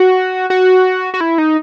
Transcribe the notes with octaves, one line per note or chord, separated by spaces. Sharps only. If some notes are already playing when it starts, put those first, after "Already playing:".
Already playing: F#4
F#4
F#4
E4
D#4